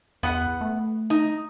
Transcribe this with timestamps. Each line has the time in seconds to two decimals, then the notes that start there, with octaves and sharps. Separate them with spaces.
0.23 E2 B3 F#5
0.61 A3
1.10 D#4